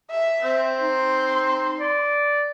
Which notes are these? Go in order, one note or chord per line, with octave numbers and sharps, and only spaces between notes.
E5
C4 C5
D#4 C6
D5